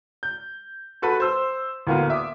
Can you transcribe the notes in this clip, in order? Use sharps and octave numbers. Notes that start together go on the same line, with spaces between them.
G6
F#4 A4 B4 B5
C5 E6
D2 A2 A#3 B3 F5
E5 D6 D#6